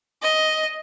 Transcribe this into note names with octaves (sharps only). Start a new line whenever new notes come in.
D#5